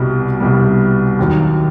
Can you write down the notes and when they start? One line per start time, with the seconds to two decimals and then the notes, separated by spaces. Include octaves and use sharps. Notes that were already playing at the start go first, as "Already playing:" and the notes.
Already playing: C2 B2 G3
0.40 C2 B2 G3
1.19 D#2 D#3 F#3